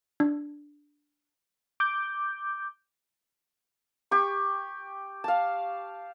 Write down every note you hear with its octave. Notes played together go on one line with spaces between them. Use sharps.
D4
D6 G6
G4 C#6
F5 A5